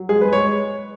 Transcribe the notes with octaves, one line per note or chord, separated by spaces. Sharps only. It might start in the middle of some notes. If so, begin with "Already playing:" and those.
Already playing: F#3
G#3 G#4
G#3 B4
C#5